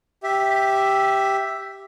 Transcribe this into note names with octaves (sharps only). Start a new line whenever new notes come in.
G4 E5